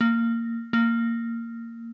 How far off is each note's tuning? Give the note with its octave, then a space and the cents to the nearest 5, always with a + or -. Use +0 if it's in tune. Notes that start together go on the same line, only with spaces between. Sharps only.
A#3 -15
A#3 -15